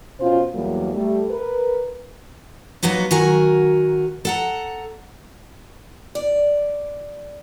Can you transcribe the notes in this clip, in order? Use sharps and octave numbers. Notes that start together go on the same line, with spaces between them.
B2 C#4 F4 C5
E2 F#3 G3 A#3
G3 A3
A#4 B4
F#3 A#3 B3 D#4 F#4
D#3 F#3 F#4 A#4 G#5
A4 F#5 A#5
D5